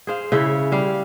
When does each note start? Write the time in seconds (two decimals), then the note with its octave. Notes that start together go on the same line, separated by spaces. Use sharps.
0.07 G#4 C5 F5
0.32 C#3 E4 C#5 E5
0.72 G3 F5